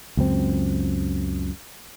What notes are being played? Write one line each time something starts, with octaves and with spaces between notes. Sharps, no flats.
C#2 F#2 C4